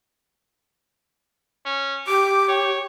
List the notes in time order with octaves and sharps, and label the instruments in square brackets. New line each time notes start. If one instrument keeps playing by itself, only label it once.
[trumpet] C#4
[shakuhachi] G4 [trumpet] D6
[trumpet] C#5